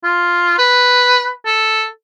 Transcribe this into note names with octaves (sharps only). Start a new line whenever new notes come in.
F4
B4
A4